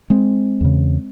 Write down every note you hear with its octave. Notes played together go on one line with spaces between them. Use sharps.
G#3 C4
E2 C#3